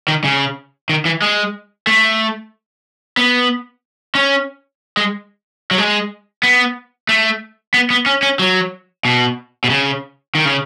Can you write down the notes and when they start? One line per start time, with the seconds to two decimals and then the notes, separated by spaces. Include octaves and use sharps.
0.08 D#3
0.24 C#3
0.89 D#3
1.05 E3
1.22 G#3
1.87 A3
3.17 B3
4.15 C#4
4.97 G#3
5.71 F#3
5.78 G#3
6.43 B3
7.09 A3
7.74 B3
7.90 B3
8.06 C#4
8.22 C#4
8.39 F#3
9.05 B2
9.64 B2
9.70 C#3
10.35 D#3
10.45 C#3